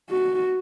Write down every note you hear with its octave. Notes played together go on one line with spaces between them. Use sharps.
F#4